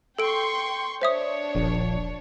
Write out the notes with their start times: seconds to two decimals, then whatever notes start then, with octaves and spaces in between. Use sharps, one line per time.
0.19 A4 G5 C6 C#6 D7
1.01 D4 C5 C#5 E5 D#6
1.55 D#1 A#1